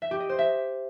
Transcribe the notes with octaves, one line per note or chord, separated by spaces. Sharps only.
E5
G4
D#5
C5
E5